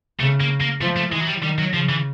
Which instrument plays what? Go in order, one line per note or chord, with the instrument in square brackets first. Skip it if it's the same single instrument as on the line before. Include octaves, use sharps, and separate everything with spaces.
[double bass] C#3 [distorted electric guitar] A3
[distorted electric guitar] A#3
A#3
[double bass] F3 [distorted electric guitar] A3
[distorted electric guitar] A3
[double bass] E3 [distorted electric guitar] G#3
[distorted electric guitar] F#3
G3
[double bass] D#3 [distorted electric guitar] G3
[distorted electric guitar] F#3
[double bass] C#3 [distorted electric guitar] F3
[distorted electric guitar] E3